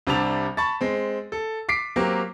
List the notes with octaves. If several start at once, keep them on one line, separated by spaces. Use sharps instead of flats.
C2 C3 G3 D4 A5 F7
A5 B5 C#6 A6
G#3 C4
A4
D6 B6 C7 D7
F#3 A#3 C4 G4